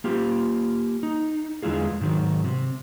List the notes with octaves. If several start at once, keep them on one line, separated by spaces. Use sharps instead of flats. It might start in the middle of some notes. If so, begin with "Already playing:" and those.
A#3 F4 G4
D#4
E2 D3 G#3 E4 F4 G#4
G#2 D#3 F#3
C3